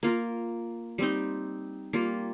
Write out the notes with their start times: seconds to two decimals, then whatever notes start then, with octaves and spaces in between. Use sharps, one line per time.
0.03 A#3 F4 A#4
0.98 G3 C4 D#4
1.93 G3 A#3 F4